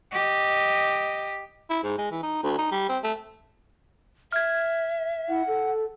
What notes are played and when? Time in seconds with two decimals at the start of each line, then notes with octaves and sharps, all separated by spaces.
0.12 G4 D#5
1.70 E4
1.84 G#2
1.98 G#3
2.11 E3
2.23 D#4
2.43 D2
2.58 D#4
2.72 G3
2.89 C4
3.04 A3
4.32 E5 F6 G#6
5.29 E4 F#5
5.47 A4